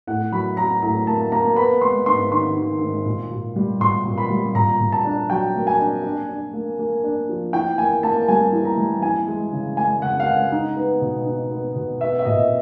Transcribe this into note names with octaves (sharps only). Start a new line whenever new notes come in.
A2 F#5
F#3 B5
F#3 A#5
A2 A#5
A#3 A5
A#3 A#5
B3 B5
G#3 C6
G#2 C6
D#3 C6
D#3
G#2
A#2
A#2
G3
A#2 C6
A#2
B5
G3
A#2 A#5
A#2
A5
D4
F#3 G5
A#3
G#5
D4
D4
D4
A#3
A#3
D4
F3
E3 G5
A#3 G#5
A#3 A5
G3 G#5
E3
A#5
G3
E3 G#5
G#3
C#3
G#3 G#5
C#3 F#5
F5
G#3 F#5
D#4
B3
B2
D#4
B3
B2
B3 E5
E5
A#2 D#5